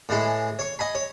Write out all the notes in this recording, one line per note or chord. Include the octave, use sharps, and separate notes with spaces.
A2 E3 G#3
C#5 C#6
D#5 G#5 B5
C#5